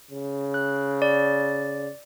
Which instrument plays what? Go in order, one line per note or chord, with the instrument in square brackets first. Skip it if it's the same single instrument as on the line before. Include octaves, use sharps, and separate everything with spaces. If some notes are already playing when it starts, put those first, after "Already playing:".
[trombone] C#3
[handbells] F#6
D5